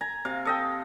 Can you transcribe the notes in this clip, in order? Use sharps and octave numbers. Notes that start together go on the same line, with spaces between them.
G#5 A#5
C3 F5
A4 D#5 G5